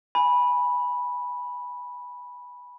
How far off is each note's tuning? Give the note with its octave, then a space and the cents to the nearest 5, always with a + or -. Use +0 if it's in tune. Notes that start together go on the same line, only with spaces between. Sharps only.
G#5 +0 B5 -10